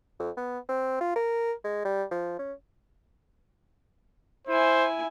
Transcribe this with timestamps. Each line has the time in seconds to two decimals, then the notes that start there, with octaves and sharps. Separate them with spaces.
0.19 F2
0.37 B3
0.69 C4
1.00 F4
1.16 A#4
1.64 G#3
1.85 G3
2.11 F3
2.39 C#4
4.48 E4 C5 G#5